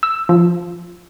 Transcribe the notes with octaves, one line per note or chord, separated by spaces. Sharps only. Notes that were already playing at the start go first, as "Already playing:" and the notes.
E6
F3